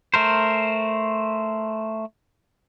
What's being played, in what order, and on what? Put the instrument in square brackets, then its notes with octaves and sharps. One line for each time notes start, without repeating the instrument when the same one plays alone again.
[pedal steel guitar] A3 A#4 C5